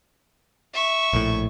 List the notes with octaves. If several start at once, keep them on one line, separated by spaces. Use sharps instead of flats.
E5 C#6
A#1 A2